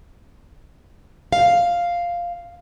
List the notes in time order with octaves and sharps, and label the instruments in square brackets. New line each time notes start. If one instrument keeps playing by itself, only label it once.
[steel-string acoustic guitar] F5